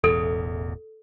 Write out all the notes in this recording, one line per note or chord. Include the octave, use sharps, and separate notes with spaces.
E1 A1 E2 A4